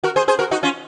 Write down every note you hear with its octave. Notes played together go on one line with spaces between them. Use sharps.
F#4 A#4
G#4 C5
G#4 C5
F#4 A#4
D#4 F#4
C#4 F4